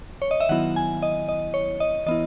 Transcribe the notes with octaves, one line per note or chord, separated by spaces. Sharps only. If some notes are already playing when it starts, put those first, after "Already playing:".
C#5
D#5
E5
D#3 F#3 B3 E4 F#5
G#5
D#5
D#5
C#5
D#5
E3 B3 E4 D#5